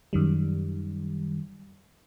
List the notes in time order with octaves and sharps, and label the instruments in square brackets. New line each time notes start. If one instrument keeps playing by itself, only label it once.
[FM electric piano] F#2 D#3 G3